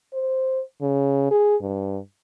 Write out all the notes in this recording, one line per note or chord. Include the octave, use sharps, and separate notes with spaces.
C5
C#3
G#4
G2